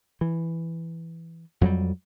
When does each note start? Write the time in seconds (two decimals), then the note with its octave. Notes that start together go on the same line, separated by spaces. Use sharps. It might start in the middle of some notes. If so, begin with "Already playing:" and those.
0.21 E3
1.61 F2 F#3 G3